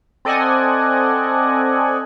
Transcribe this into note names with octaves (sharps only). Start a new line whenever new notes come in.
C4 A4 D5 D#5 F#5 G#5